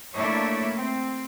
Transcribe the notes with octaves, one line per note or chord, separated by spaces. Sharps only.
A3 A#3 D4 E4 C#5
C4